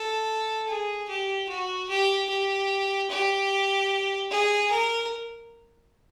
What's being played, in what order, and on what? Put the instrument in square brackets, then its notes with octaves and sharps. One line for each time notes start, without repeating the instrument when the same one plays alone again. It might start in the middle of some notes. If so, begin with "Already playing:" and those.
Already playing: [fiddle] A4
G#4
G4
F#4
G4
G4
G4
G#4
A#4